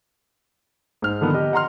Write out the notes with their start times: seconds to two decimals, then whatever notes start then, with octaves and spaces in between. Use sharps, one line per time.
1.02 G#2 F6
1.21 D3 D#3 F3 B3
1.34 G4 D#5
1.53 F#5 A#5 C6 F6